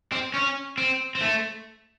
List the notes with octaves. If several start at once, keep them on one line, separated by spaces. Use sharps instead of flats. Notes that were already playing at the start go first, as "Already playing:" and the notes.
C4
C#4
C4
C4
A3